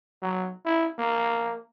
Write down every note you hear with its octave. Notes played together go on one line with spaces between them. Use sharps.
F#3
E4
A#3